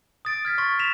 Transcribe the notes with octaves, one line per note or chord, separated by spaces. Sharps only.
D#6 A6 D7
F6 G#6 B6
C6 C#6 A6 B6
B6 E7 F7